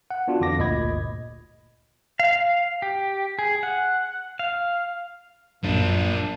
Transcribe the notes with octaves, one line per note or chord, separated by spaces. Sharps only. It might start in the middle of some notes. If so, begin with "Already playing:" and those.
F#5
B3 D4 F4 F#4
F2 D3 E3 D6 A#6
G1 D2 A#2 D#5 B5 G#6
F5
G4
G#4
F#5
F5
A#1 F#2 A#2 D4 F4